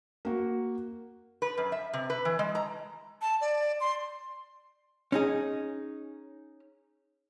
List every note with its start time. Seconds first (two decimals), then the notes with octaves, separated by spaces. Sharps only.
0.25 A#3 F#4
1.42 B4
1.58 F#2
1.72 E5
1.94 C3
2.10 B4
2.25 E3
2.39 G#3
2.55 A#5
3.22 A5
3.41 D5
3.80 C6
5.12 C#4 D#4 G#4